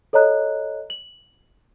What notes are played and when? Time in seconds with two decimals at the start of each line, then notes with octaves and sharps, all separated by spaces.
0.13 A4 C#5 D#5 A#5 F#6
0.90 F#7